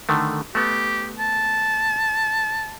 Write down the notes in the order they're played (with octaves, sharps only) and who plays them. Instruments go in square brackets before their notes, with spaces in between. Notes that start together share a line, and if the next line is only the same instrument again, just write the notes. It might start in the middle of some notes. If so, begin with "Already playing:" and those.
[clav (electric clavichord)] D3 D#3 A3
[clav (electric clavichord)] A3 B3 [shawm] G4
[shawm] A5